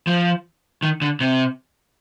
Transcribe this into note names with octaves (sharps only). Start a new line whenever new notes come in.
F3
D#3
D3
C3